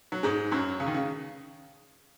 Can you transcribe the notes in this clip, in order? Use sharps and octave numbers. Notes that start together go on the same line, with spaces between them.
F#3
G#2 G#3
F#2 F#3
C#3
D#3
C#3